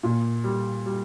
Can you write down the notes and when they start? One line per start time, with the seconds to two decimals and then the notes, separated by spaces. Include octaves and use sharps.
0.03 A#2
0.44 G3
0.86 G3